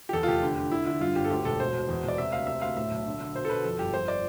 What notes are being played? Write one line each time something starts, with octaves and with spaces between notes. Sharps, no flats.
G4
E2 A4
F4
F1 G4
D3
D3
D3 E4
D3 E4
G2 F4
G1 G4
A4
D2 G4
E1 A4
B2 C5
B2
E2
E1 D5
C3 E5
D2 F5
C3 E5
D2 F5
A2 E5
B1
D3
D3
B2 C5
A4
B2 B4
F2 A4
G1 G4
F2 C5
D5